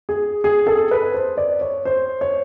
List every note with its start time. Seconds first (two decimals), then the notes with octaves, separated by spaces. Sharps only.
0.09 G#4
0.44 G#4
0.67 A4
0.91 B4
1.14 C5
1.37 D5
1.61 C#5
1.85 C5
2.21 C#5